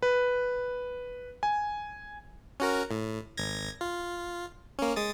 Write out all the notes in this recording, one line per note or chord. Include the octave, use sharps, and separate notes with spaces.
B4
G#5
C#4 F#4 A#4
A2
G#1 G#6 A#6
F4
A#3 C#4
G#3 D#6 A6